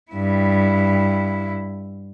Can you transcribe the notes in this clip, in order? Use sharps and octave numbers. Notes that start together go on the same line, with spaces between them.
G2 E4